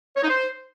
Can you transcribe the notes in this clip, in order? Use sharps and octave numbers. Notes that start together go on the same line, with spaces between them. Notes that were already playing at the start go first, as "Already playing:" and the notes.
C#5
D#4
C5